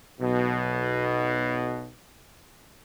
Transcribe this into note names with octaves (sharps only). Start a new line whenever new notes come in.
B1 B2